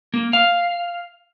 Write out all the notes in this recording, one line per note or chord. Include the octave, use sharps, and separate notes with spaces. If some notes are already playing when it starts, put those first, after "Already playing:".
A#3
F5